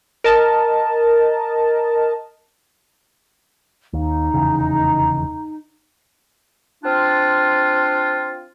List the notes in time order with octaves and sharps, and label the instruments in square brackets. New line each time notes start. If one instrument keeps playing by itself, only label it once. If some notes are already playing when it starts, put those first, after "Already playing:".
[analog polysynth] A#4 D#5 A5
[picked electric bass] D#2 [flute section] D#4
[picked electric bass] F1 E2 C#3
[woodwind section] C4 D4 F4